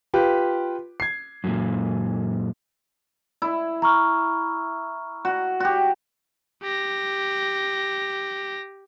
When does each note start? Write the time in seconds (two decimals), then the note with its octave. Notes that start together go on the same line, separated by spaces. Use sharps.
0.14 F4 G4 B4
1.00 G#6 C7
1.44 F#2 A#2
3.42 E4
3.82 A#5 C#6 F6
5.25 F#4
5.60 F#4 G4
6.63 G4 A#6